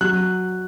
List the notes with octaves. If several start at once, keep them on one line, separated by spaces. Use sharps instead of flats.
F#3 F#6